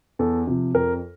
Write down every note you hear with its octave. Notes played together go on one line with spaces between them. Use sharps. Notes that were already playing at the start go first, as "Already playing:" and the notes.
E2 A4
C3 F3
F2 A#4